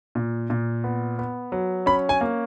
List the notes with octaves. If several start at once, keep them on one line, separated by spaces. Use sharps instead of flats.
A#2
A#2
B3
B3
F#3
C#4 B5
G#5
A#3